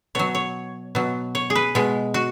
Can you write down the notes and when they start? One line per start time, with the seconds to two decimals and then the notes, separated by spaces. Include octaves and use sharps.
0.15 B2 F#3 C#5
0.35 C#5
0.95 B2 F#3
1.35 C#5
1.50 G#4
1.55 B4
1.75 B2 G#3
2.14 F#4